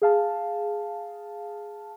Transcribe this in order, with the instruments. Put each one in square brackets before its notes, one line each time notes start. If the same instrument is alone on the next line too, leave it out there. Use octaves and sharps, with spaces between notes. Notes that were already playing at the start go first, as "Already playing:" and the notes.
[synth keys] G#4 F5 A5